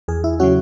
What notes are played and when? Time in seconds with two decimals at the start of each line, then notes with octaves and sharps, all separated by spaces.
0.08 E2 G#4
0.24 E4
0.39 C#3 F#3 C#4 F#4